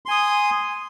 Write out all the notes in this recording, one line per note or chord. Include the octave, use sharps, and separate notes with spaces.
G#5 C6 D#6